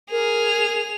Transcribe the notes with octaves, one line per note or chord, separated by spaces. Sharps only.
G#4 A#4 F7